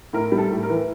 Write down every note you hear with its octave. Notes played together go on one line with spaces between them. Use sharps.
A2 A#4
G3
A4
A2
A#4
E3